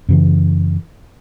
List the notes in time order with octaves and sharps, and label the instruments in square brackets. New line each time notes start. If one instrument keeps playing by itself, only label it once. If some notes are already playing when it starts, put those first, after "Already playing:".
[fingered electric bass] F#2 C#3 E3